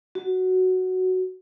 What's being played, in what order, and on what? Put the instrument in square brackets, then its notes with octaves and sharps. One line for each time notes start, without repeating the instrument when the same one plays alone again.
[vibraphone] F#4